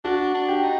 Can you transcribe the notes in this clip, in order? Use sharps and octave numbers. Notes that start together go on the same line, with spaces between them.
D4 F#4
D4
G4
D#4